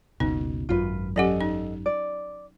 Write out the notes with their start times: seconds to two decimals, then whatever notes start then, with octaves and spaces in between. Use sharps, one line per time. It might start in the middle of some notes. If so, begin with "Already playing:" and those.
0.20 F#1 C#2 B2 D#4
0.69 G#1 F#2 F4 B4
1.16 F#3 C#4 G4 A4 D#5 F#5
1.41 D#4
1.86 D5